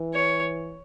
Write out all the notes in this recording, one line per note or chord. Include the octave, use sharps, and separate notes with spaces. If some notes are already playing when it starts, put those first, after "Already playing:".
Already playing: E3
C#5